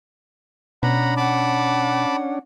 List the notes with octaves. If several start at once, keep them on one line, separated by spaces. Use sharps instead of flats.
B2 C#4 D4 F#5 A#5 B5
F#5 A5 B5 D6